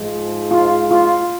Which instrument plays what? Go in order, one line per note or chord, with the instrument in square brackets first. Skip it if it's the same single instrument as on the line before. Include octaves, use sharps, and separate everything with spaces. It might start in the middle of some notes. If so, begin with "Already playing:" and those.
Already playing: [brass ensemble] G#2 F3 G#3
[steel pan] F4
F4